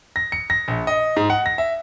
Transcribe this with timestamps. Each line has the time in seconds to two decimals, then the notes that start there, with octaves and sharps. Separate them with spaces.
0.16 A#6
0.32 C#7
0.50 A#6
0.68 A#1
0.87 D#5
1.16 G#2
1.30 F#5
1.46 A#6
1.58 E5